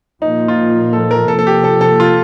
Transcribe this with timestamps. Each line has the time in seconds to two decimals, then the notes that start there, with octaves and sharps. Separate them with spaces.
0.22 A#2 F3 A#3 D#4
0.48 F4
0.93 A4
1.11 A#4
1.28 C3 F3 A#3 A4
1.39 A4
1.47 G4
1.64 A4
1.81 A4
2.00 F4